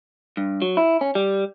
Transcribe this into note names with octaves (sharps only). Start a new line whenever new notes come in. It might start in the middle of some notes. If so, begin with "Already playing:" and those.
G2
F#3
E4
C#4
G3